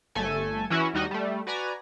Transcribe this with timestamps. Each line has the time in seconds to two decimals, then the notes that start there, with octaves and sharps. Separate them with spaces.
0.15 G1 A3 A4 G#5
0.70 E3 C#4 E4 F#4
0.94 D#2 G3 D#4 F#4 D#5
1.11 G3 A3
1.47 F#4 B4 D5 G#5 A#5